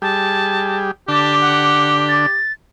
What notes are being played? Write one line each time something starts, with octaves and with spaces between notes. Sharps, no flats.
G3 G4 G#4 A5
D3 D4 G4 A5
F#5
A6